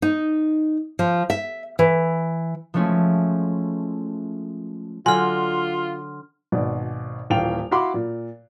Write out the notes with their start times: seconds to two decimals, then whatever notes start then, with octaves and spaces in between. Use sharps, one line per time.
0.02 D#4
0.99 F3
1.30 E5
1.79 E3
2.74 F3 G#3 A3 C#4 E4
5.06 D3 F#3 F4 G#5 C6 F6
6.52 G#1 B2 D5
7.30 D#1 A#2 E3 F4 G5 F7
7.71 E4 F#4 F5 B5 C6 D6
7.94 A#2